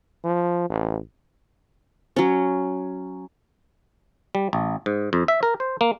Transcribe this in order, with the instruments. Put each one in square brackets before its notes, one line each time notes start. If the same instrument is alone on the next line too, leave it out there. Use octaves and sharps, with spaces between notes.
[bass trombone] F3
A1
[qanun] F#3 C#4
[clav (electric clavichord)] G3
A1
G#2
F2
E5
A#4
C5
A#3